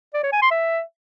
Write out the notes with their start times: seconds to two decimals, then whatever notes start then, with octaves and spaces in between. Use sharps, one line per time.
0.14 D5
0.23 C#5
0.33 G#5
0.42 C6
0.51 E5